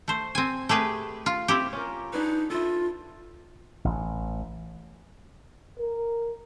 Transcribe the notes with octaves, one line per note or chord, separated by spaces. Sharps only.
A3 C5
C4 G#5
A3 G4 G#4 B4
F4
C4 E4 G4
C#4 F4 A#4
D4 D#4 G#4 B4
E4 F4 A4
A1
A#4